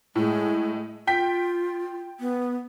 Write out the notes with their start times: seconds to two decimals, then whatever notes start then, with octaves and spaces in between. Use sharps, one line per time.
0.16 A2 G#3
1.07 F4 G5 B6
2.20 B3